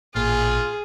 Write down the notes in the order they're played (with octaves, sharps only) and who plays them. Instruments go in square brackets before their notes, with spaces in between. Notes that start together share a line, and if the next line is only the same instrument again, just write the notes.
[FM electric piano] A1 A#2 [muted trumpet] F4 [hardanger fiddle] G#4